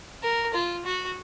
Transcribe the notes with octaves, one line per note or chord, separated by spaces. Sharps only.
A#4
F4
F#4